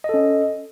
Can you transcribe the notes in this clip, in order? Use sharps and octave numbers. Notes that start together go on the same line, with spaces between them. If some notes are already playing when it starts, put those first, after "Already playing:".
C#4 A4 D#5